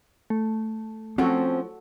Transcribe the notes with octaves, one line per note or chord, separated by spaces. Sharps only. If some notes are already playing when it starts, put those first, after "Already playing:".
A3
F3 C4 C#4 F#4 A4